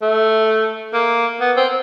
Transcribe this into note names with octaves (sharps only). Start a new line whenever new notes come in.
A3
A#3
B3
C4